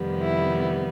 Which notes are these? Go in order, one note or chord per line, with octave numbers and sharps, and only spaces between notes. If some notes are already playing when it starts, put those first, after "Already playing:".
Already playing: F2 C3 D#3 G3 B3
E4